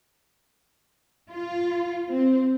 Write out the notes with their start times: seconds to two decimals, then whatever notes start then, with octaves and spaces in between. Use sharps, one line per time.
1.30 F4
2.09 C4